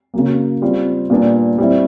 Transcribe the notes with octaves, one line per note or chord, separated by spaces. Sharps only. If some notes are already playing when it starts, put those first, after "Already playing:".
C#3 F#3 A#3
G3 C4 F4
A#2 G3 B3 D4
G3 C4 E4